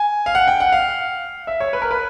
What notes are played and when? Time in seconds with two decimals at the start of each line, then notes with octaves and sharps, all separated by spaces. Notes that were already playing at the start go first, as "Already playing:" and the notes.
Already playing: G#5
0.26 F5
0.35 F#5
0.48 G5
0.60 F#5
0.72 F5
1.47 E5
1.60 C#5
1.73 B4
1.82 A#4
1.91 B4